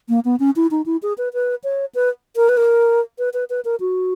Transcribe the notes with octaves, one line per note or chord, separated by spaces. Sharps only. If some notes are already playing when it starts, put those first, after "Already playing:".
A#3
B3
C#4
E4
D#4
E4
G#4
B4
B4
C#5
B4
A#4
B4
A#4
B4
B4
B4
A#4
F#4